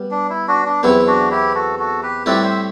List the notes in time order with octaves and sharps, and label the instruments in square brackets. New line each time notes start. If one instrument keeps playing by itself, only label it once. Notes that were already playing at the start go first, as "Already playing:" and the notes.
Already playing: [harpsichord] G3 B3
[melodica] D4
E4
D4 F#4
D4
[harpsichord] E2 C3 F#3 B3 [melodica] E4
[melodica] D4 F#4
E4 G4
F#4 A4
F#4 A4
G4 B4
[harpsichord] A2 G3 C4 E4 [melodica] B4 D5
[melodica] C5 E5